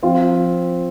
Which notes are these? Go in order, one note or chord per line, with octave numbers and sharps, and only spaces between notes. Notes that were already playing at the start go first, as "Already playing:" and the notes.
F3 C4 F4